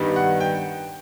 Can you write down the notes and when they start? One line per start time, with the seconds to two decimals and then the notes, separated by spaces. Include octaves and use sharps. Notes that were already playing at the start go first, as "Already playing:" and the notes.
Already playing: G2 D#3 G3 B3
0.16 F#5
0.40 G5